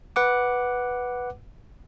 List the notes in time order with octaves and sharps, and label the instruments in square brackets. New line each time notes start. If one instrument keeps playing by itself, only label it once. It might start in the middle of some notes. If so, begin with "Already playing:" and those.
[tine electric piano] B4 F#5 D6